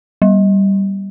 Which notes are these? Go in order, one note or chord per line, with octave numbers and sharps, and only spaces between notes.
G3